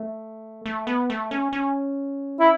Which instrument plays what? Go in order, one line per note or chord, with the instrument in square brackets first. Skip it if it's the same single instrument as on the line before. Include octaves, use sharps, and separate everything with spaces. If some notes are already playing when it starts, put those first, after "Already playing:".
Already playing: [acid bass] A3
A3
B3
A3
C#4
C#4
[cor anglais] E4